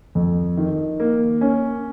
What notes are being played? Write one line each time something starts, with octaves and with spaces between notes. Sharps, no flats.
F2
D#3
A#3
C#4